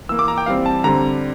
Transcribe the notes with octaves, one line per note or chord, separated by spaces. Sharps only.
E3 A#3 E6
D6
A#5
G5
E3 G3 C4 F5
A5
D3 G3 C4 A#5